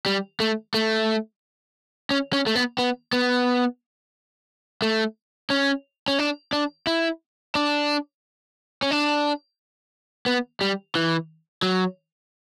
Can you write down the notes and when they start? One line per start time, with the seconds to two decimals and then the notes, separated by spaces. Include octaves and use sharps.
0.06 G3
0.40 A3
0.74 A3
2.11 C#4
2.33 C#4
2.46 A3
2.56 B3
2.78 B3
3.13 B3
4.82 A3
5.50 C#4
6.08 C#4
6.19 D4
6.53 D4
6.87 E4
7.55 D4
8.82 C#4
8.91 D4
10.26 B3
10.61 G3
10.95 E3
11.63 F#3